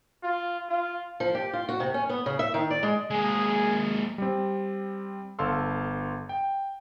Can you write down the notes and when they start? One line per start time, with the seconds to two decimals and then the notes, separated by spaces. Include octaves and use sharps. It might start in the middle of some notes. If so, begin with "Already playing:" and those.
0.24 F4
0.69 F4
1.20 F3
1.35 G4
1.53 F4
1.69 F#4
1.80 C3
1.94 C#4
2.09 B3
2.26 C#3
2.39 E5
2.54 D#3
2.70 D5
2.83 G#3
3.11 G#3 A#3 G#4
4.18 G3 C4
5.39 G1 A4 F5 C6 E6
6.29 G5